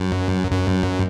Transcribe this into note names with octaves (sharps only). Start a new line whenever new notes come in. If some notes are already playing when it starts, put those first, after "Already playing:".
Already playing: F#2
F#2